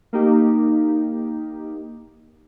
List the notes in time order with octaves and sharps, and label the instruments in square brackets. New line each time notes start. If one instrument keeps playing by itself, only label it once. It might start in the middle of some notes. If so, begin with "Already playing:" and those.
[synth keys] A#3 D#4 G4